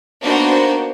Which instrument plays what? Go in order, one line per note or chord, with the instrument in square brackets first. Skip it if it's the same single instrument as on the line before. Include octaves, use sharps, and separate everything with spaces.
[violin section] A#3 B3 D4 D#4 F#4 C5